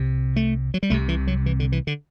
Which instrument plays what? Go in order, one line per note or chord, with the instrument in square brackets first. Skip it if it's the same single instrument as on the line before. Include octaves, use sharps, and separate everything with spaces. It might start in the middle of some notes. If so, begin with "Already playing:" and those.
Already playing: [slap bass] C2 C3
A3
F#3
G3
C2 C3 A3
E3
F#3
E3
D3
E3
D3